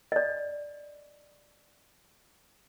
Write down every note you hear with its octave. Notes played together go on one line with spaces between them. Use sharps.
D5 D#5